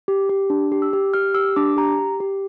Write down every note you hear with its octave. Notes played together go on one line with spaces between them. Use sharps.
G4
G4
D4
G4
E6
G4
G4 F6
G4 E6
D4 D6
G4 A#5
G4
G4